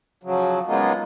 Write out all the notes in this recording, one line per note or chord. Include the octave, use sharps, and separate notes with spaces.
C#3 F3 F#3
C#3 G#3 A#3 B3 D#4 F4